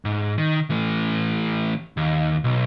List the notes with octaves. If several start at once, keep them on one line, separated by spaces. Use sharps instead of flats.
G#2
D#3
E3 A3
D#2
B1